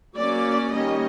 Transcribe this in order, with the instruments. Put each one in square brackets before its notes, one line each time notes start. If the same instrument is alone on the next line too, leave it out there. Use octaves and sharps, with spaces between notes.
[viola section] F#3 A#3 C#4 D5
D#3 G3 A#3 C#4 D#5